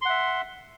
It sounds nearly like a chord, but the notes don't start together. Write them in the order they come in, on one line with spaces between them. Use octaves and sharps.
C6 F#5 E5